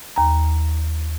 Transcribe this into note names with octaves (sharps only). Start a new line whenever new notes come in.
D#2 A#5